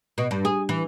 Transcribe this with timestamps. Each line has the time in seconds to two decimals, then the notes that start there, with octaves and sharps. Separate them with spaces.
0.18 B2
0.31 G2
0.45 G#4
0.69 E3